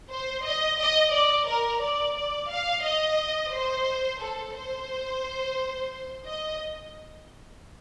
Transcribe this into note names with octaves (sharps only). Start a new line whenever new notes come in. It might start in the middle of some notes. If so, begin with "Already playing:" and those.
C5
D#5
D#5
D5
A#4
D5
D5
F5
D#5
C5
A4
C5
D#5